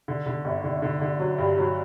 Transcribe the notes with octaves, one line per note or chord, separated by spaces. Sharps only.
D3
D3
G1
D3
D3
D3
F#3
G2
F#3